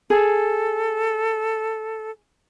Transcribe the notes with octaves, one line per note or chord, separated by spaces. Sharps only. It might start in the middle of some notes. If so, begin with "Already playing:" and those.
G#4 A4